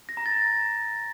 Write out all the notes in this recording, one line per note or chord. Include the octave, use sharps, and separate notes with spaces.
A#6
A#5
A6